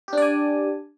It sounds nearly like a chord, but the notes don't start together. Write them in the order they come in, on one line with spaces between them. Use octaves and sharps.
G4 D4 D5 G#5